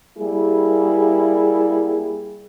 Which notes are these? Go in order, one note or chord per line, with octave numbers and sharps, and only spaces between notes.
G3 A#3 E4 G#4